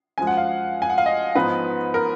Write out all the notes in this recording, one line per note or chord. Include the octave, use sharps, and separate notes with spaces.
F#2 F3 G#3 G#5
F#5
F5
G#5
F#5
F5
D#5
G#2 F3 B3 D#4 B4
A#4